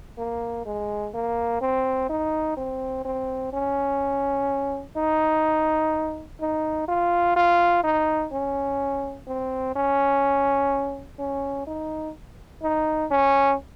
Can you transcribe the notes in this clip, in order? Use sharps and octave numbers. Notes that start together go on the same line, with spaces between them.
A#3
G#3
A#3
C4
D#4
C4
C4
C#4
D#4
D#4
F4
F4
D#4
C#4
C4
C#4
C#4
D#4
D#4
C#4